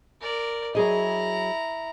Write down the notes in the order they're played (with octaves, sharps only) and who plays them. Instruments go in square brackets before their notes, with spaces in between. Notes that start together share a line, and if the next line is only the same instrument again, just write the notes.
[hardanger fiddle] A#4 D5
[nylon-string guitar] F#3 G#4 D#5 [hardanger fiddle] E4 A#5